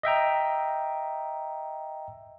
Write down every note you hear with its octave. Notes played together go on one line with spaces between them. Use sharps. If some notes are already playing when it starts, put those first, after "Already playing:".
D#5 E5 G5 A#5